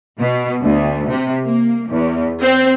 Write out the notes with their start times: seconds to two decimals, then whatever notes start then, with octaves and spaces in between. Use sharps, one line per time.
0.19 B2
0.62 D2
1.09 C3
1.43 A#3
1.89 E2
2.42 C4